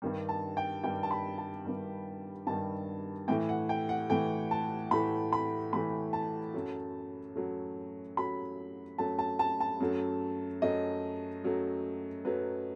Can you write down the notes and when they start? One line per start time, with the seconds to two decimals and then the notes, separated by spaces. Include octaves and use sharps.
0.02 G2 D#3 G3
0.29 A5
0.57 G5
0.84 G2 D#3 G3 G5
1.03 A5
1.11 B5
1.38 A5
1.65 G2 D#3 G3
2.47 G2 D#3 G3 A5
3.28 A2 E3 A3 G5
3.49 F#5
3.69 G5
3.89 F#5
4.10 A2 E3 A3 G5
4.51 A5
4.91 A2 E3 A3 B5
5.33 B5
5.73 A2 E3 A3 B5
6.13 A5
6.54 F#2 F#3 A3
7.36 F#2 F#3 A3
8.17 F#2 F#3 A3 B5
8.98 F#2 F#3 A3 A5
9.19 A5
9.39 A5
9.60 A5
9.80 F#2 F#3 A3
10.62 F#2 F#3 A3 D#5
11.44 F#2 F#3 A3
12.25 F#2 F#3 A3 B4